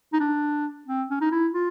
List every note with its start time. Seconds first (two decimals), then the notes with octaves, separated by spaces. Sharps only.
0.13 D#4
0.20 D4
0.87 C4
1.10 C#4
1.21 D#4
1.32 E4
1.54 F4